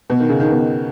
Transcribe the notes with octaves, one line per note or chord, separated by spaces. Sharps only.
B2
D#3
C#3
D#3
B2